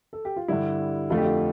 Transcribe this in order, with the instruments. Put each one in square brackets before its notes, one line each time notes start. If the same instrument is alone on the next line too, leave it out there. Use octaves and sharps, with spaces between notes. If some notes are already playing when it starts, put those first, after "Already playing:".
[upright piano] A4
G4
F4
G2 D3 G3 E4
F2 D3 A3 F4
G4
F4